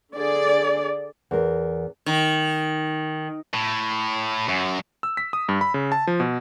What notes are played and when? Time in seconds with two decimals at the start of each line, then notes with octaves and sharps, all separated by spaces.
0.15 D3 G#4 D5
1.31 E2 A#4
2.06 D#3
3.53 A2
4.48 F#2
5.03 E6
5.17 B6
5.33 D#6
5.49 G2
5.61 B5
5.74 C#3
5.92 A5
6.07 F3
6.20 B2